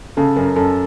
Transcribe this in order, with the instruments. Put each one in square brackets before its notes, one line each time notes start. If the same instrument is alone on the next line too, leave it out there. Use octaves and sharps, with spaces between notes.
[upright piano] C#3 [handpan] A4
[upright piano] F#2 [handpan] A#4
[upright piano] F#2 [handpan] A4